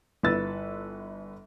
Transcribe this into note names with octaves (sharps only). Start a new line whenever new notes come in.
G1 E4 B4 E6 A6